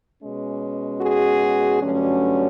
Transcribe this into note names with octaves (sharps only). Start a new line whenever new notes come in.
B2 G#3 C#4
F#4 G#4
G2 D3 F#3 A3 C#4